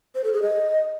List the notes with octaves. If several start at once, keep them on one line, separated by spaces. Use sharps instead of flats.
C5
A4
G#4
D#5